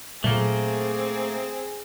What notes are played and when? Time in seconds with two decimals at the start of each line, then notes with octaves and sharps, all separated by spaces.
0.24 A#2 F#3 A3 A#3 C4 G#4